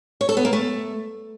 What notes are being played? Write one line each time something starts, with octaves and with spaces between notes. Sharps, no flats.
C#5
A4
B3
A#3
A3